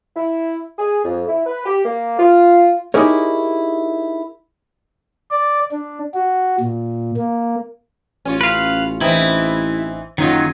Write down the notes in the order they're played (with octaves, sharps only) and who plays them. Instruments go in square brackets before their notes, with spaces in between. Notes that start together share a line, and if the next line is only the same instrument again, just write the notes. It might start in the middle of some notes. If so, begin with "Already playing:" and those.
[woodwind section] E4
G#4
F2
E4
B4
G4
A#3
F4
[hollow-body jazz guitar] D#4 E4 G4 G#4 A#4 C#5
[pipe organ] D5
D4
F#4
A#2
A#3
[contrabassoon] A1 [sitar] C#4 F4
[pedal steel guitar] B4 F5
[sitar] E3 C4 D#4 [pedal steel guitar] E4
[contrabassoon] F#1 [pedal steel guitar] D#3 [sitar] F#3 D#4 F4